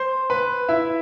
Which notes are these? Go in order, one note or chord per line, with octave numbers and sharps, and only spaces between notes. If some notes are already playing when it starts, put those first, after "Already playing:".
Already playing: C5 C6
B4 B5
E4 E5